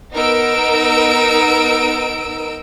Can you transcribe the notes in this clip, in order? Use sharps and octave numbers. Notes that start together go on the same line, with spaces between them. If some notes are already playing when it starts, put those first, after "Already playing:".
B3 D#4 A#4 E6 D7